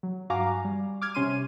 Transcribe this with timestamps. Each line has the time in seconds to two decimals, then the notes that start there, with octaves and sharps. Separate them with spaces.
0.03 F#3
0.30 G2 F#4 F5 G#5 A#5 D6
0.65 G3
1.02 D6 F6 G#6
1.14 C3 C#4 C6 D#7